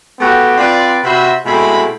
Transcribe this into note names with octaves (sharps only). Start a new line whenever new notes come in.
A3 B3 F#4 G4
C4 F4 B4 D5
C3 F#4 C5 E5 B5
B2 G#3 A3 C4 E4 B5